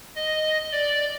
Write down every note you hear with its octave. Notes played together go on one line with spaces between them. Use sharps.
D#5
D5